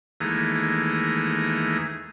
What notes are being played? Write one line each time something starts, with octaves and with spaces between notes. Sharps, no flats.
D#2 E3 G#3 A3 A#5